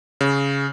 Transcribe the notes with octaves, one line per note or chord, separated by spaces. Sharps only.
C#3